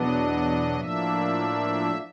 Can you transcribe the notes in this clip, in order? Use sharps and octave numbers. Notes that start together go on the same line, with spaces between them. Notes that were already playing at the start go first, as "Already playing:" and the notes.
Already playing: E2 B2 F#3 B3 D4 D#5
A2 F3 A#3 D4 E5